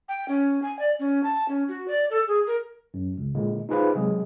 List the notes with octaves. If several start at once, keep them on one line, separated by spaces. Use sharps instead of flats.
G5
C#4
G#5
D5
C#4
A5
C#4
F#4
D5
A4
G#4
A#4
F#2
C#2
A#2 D3 G#3
D#4 F4 G#4 B4 C5 F5
C3 F#3 G#3 C4 G#4